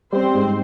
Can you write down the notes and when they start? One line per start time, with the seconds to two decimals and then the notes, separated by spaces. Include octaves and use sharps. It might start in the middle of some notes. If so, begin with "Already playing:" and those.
0.12 G3 C4 C5
0.34 G#2